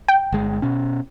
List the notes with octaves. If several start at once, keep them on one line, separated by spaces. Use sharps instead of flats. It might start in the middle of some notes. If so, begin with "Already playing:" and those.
G5
G1 G#3
B2 C#4